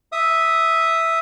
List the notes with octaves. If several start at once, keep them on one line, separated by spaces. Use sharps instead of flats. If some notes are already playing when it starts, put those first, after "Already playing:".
E5 D#6